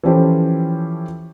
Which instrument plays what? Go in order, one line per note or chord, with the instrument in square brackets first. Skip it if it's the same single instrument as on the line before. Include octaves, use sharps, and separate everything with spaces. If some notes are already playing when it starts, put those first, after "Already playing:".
[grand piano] E3 F3 C#4 G4 A4 C5